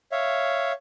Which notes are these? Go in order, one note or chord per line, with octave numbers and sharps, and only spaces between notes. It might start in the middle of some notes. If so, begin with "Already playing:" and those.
C#5 E5 F5